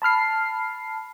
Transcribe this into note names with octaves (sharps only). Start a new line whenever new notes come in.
A5 B5 F6 C7